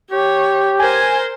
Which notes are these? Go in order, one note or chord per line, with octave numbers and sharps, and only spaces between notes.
G4 C#5
A#4 C5 G#5